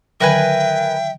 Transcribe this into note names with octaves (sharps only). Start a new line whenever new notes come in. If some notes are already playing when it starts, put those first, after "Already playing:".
D3 D#3 F#3 A#4 B4 E5 G5 G#5